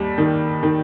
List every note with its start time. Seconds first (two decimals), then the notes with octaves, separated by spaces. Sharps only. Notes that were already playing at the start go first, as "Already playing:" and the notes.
Already playing: D#2 G3
0.18 D#3
0.63 D#3